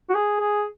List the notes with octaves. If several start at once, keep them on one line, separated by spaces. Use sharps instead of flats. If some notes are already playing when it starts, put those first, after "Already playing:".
F#4
G#4
G#4